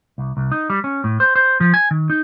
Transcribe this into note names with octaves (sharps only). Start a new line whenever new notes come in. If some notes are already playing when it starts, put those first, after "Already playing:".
C2
C2
D#4
G3
C#4
A2
C5
C5
F3
G#5
D#3
D#4